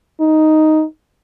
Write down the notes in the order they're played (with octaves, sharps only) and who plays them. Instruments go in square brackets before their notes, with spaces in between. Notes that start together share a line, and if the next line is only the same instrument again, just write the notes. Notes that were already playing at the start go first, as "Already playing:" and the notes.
[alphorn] D#4